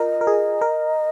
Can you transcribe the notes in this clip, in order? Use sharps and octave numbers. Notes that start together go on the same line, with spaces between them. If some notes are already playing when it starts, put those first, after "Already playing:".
Already playing: F4 A#4 D#5
A#4
G#4
A#4